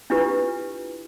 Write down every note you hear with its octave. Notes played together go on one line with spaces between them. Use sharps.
D4 E4 F4 G4 B4